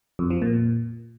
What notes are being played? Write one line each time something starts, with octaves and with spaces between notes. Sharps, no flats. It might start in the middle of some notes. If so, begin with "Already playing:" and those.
F2
F3
A#2